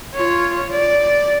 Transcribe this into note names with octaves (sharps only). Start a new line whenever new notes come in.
F4 C#5
D5